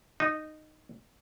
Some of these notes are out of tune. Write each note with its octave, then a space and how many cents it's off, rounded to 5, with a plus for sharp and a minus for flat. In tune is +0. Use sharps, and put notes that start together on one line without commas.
D#4 -10